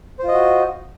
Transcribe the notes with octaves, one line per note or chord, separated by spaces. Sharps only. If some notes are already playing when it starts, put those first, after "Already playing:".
F4 F#4 C5 D#5